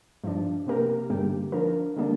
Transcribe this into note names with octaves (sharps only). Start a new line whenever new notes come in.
G2 F3 D4
C3 A#3 G4 A#4
G2 D3 G3 A#3 G4
F3 D4 A#4
D3 G3 A#3 D4